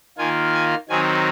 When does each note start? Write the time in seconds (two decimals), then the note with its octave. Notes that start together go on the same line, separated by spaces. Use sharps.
0.18 D#3 A#3 F4 G#5
0.53 G#5
0.89 D#3 F#3 C4 D#4 G#5